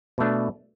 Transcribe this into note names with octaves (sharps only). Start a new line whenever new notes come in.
B2 A3 D4